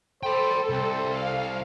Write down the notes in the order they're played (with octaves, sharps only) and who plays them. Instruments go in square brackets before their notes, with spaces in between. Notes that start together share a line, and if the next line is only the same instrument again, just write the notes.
[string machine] A4 [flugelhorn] C5 [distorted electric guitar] G5 B5
[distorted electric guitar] C2 [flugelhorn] C4
[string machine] F5